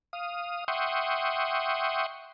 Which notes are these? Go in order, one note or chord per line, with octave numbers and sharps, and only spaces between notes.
F5 D#6
E5 F#5 G5 C6 C#6 D#6